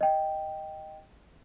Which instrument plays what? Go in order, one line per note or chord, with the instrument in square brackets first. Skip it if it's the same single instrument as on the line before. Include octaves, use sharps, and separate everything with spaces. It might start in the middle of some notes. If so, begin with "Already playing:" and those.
[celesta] D#5 G5